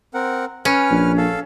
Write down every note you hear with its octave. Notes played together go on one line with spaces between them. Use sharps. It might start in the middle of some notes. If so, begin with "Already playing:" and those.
C4 A#4 F#5
C#4 B4 F6
A#1
A4 F5